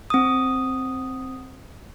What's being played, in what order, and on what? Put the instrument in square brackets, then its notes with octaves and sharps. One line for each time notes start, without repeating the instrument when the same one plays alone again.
[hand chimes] C4 D#6